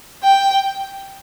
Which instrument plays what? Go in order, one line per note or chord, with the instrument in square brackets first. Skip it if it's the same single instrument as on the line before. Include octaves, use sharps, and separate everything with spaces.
[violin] G5